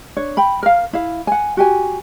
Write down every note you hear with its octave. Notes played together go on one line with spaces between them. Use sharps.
D4 C#5
G5 B5
A#4 F5
E4 F5
F#5 G#5
F#4 G4 G#5